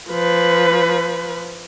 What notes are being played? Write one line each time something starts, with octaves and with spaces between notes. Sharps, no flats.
F3 B4